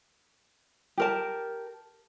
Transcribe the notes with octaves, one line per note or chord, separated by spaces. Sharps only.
G4 A#4 A5